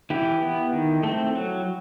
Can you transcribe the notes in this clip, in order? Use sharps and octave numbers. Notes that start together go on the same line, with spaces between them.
E3 E4 G4
B3
D#3
A3 C4
F#3